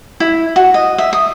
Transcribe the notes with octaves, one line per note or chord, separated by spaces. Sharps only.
E4
F#4
D#5
E5
D#6